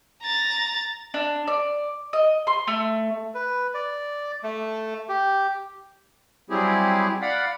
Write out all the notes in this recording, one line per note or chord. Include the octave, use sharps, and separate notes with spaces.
A#5 A6
D4
D5
D#5
C6
A3
B4
D5
A3
G4
F#3 G3 C4 E4 G4 G#4
D5 F5 F#5 B5